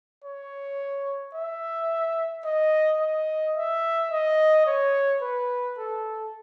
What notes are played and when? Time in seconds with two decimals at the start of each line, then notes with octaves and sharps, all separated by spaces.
0.24 C#5
1.34 E5
2.45 D#5
3.00 D#5
3.57 E5
4.11 D#5
4.66 C#5
5.22 B4
5.78 A4